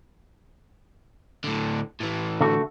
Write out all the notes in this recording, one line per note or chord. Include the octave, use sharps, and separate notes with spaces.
A2 D3
A2 E3
D3 A3 F#4